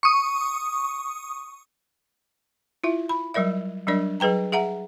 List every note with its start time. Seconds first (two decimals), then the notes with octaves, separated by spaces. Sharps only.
0.03 C#6 D#6
2.84 E4 F4 E5
3.09 B5
3.34 F#3 G3 A#4 D5 E5
3.87 F#3 G3 D4 A#4 D5
4.20 F#3 G#4 B4 G5 A#5
4.52 G#4 E5 F#5 A#5